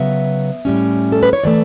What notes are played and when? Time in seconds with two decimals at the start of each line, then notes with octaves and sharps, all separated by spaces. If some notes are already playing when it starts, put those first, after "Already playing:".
Already playing: C#3 F#3 B3 E5
0.65 A2 G3 C#4
1.12 A4
1.23 B4
1.33 C#5
1.44 E3 A3 D5